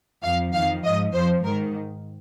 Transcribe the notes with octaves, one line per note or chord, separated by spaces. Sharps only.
F2 F3 F5
F2 D#3 F5
G#2 F3 D#5
F2 F3 C5
G#2 D#3 A#4